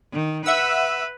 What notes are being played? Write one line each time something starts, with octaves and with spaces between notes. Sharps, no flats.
D#3
B4 E5 F#5 E6